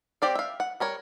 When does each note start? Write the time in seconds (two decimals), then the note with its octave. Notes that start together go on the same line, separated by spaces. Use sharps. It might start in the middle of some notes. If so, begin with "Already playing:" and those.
0.22 C4 G4 D5 F5
0.35 E5 F5
0.60 F#5
0.80 G3 A#4 C#5